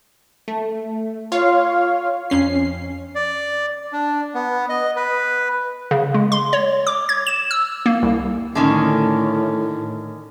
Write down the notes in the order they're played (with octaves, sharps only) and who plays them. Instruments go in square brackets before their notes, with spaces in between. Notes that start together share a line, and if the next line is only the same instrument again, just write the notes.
[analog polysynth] A3
F4 C#5 F5
F2 C#4 C7
[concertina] D5
D4
B3
D#5
B4
[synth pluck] C#3
G#3
C6
C#5
D6
G#6
E7
E6
A#3
C2
[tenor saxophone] A2 [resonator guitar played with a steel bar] D3 D#3 C#4